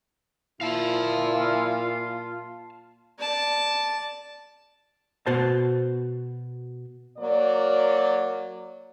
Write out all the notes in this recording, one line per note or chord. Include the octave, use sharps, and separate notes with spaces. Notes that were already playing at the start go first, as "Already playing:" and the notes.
A#2 E4 F4 F5 A5
D5 A5
B2 F#4 C5 A5
F#3 A#3 D5